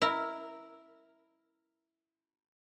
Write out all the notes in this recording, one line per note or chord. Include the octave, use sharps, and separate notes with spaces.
E4 A#4